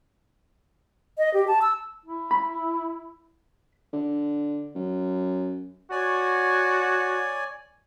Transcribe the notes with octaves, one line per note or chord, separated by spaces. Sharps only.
D#5
G4
A5
E6
E4
B5
D3
F#2
F#4 C#5 D5 G#5